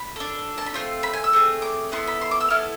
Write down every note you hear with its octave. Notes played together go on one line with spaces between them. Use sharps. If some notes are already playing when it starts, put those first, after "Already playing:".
Already playing: B5
D4 A4
A5
B5
A3 C4 F4 C6
B5
G#5
E6
A3 C4 G#4
D6
B3 E4 A4 C6
B5
C6
D6
E6
B3 E4 A4 F6